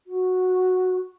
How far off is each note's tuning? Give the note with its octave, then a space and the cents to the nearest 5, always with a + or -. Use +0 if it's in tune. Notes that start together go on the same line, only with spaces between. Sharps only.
F#4 -10